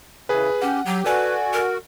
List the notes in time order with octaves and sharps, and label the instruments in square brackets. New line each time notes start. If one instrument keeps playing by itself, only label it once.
[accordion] C#3 E3 [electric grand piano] G#4 B4
[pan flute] C#4 [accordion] G4 [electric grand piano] F#5
[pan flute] F#3 [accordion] G4
[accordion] F#4 [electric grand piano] A4 D5 G#5 [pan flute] B4
[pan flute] A#4